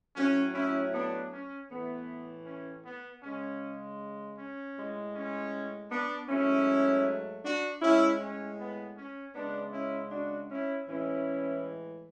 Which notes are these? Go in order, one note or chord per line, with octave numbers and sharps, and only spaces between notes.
A2 F#3 A3 C#4
C#4 E4
B3 D4
C#4
A2 E3 A3 B3
C#4
B3
C#3 G#3 C#4
C#4
A2 G#3
C#4
B3 D4
G#2 F#3 A3 C#4 E4
D4 F#4
A2 G#3 C#4 E4
C#4
B3
C#4
C#3 G#3 B3 D4
C#4 E4
D4 F#4
C#4 E4
A2 E3 G#3 C#4 E4